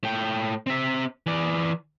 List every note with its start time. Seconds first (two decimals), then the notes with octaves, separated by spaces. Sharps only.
0.03 A2 G5
0.67 C4 E5
1.26 E3 D5